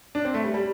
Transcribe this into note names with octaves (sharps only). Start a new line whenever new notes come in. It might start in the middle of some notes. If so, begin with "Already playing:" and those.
D4
C4
A3
G3
G3